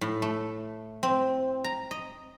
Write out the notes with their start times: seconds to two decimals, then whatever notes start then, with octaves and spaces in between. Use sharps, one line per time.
0.01 A2
0.22 A3
1.03 C4
1.64 A#5
1.91 D#5